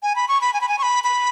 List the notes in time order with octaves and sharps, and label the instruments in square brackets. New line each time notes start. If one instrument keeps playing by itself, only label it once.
[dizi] G#5
B5
C#6
B5
G#5
B5
G#5
C#6
B5
B5